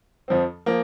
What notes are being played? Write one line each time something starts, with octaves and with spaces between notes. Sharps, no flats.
F2 F3 C4
F3 A#3